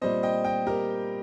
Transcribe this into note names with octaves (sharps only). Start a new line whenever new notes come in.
A#2 G3 C4 C5 D#5
D#5 G5
D#5 G5
G4 A#4